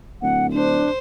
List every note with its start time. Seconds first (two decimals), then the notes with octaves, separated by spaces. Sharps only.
0.22 D1 F#5
0.54 D4 C5